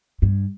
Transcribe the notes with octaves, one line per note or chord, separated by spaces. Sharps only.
G2